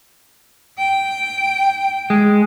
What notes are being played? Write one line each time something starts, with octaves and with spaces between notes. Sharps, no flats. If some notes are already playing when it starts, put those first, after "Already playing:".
G5
G#3